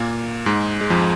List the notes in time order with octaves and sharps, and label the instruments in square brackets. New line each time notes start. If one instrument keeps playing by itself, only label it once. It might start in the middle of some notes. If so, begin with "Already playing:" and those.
Already playing: [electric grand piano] A#2 A#3
G#2 G#3
G#3
F2 F3